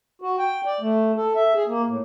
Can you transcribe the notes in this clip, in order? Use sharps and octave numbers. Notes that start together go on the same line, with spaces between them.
F#4
G5
D5
A3
A4
E5
G#4
A#3
A2